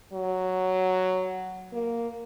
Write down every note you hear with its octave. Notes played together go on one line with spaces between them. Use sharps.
F#3
A#3